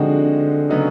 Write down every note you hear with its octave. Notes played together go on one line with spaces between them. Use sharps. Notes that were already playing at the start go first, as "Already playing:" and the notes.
Already playing: D3 F3 G#3 C4 D#4 F#4
C#3 F#3 B3 D#4